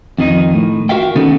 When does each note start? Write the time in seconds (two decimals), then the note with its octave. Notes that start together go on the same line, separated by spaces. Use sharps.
0.18 F2 D#3 D#4
0.54 A2
0.89 F#4 A#4 E5 F5 G5
1.16 D#3 B3 C#4 D#4 A4